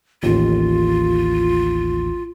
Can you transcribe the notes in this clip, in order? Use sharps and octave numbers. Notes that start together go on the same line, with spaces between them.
A1 D#2 F4